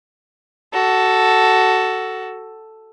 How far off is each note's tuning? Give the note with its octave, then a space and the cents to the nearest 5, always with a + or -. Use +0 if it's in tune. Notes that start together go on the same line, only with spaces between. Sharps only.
F#4 +15 A4 +0